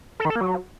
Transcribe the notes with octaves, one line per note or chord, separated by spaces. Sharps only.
A4
D#3
A4
A#3
F#3